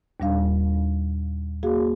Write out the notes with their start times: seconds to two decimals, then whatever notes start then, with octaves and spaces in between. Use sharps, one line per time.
0.20 D#2 A#2 G3 D4 F5
1.63 A#3 F#4 G#4 F5